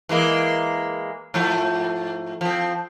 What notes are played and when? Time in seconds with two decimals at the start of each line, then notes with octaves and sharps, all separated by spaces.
0.09 E3 G#3 A#3
1.34 G#2 F3 A3
2.41 F3 C4